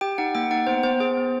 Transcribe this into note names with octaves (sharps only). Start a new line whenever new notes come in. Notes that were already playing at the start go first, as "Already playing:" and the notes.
G4 G5
D#4 F#5
A#3 G5
D#4 F#5
B3 C5
B3 C5
G#4 C5
B3